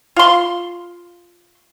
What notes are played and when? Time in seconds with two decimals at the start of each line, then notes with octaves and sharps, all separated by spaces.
0.16 F4 C6